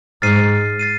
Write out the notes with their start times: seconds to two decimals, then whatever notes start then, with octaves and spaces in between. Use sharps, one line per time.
0.22 G#2 F6 A6 C7 D#7
0.79 A6 C7 D#7